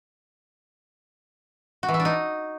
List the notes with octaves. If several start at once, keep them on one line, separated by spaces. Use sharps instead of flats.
F#4
E3
E4
D4
D#4